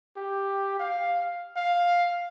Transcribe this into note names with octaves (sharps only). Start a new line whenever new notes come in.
G4
F5
F5